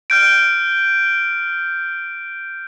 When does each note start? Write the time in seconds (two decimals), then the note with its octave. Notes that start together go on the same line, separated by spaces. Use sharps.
0.10 F6 G6 D7